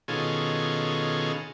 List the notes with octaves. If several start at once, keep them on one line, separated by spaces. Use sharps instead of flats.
B2 D#3 C#4 F4 G#4 A4